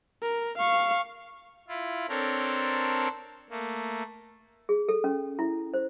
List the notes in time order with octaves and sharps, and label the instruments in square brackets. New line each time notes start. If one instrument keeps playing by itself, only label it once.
[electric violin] A#4
F5 C#6
[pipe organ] E4 F4
C4 D4 A4 A#4 C5 C#5
A3 A#3
[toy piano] G#4
A4
C#4
E4
C5